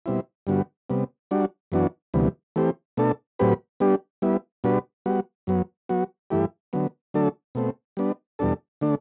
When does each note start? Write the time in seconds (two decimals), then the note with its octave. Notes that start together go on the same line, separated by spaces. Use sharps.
0.06 B2 G3 C4 E4
0.47 G2 D3 G3 B3 F#4
0.90 C3 G3 B3
1.31 G3 D4 F#4
1.72 F#2 E3 B3 D4 F#4
2.14 D2 C3 E3 G3 B3
2.56 E3 A3 C4 G4
2.97 B2 A3 D4 A4
3.39 A2 F#3 C4 G4 B4
3.80 G3 B3 D4 G4
4.22 G3 B3 E4
4.64 B2 G3 D4 F#4 B4
5.06 G3 B3 F#4
5.47 F#2 F#3 B3
5.89 F#3 B3 F#4
6.30 G2 E3 A3 E4 G4
6.73 D3 F#3 B3
7.14 D3 F#3 A3 D4 A4
7.55 B2 A3 C4
7.97 G3 B3 D4
8.39 E2 B2 G3 D4 A4
8.81 D3 A3 D4